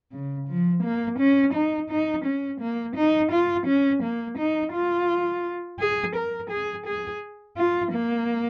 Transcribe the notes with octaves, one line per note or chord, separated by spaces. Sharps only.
C#3
F3
A#3
C#4
D#4
D#4
C#4
A#3
D#4
F4
C#4
A#3
D#4
F4
G#4
A#4
G#4
G#4
F4
A#3